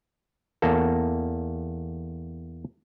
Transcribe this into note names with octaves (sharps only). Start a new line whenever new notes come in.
E2 A#3 A4